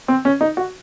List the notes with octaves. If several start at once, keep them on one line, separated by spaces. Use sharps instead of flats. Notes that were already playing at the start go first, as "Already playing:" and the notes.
C4
C#4
D#4
F#4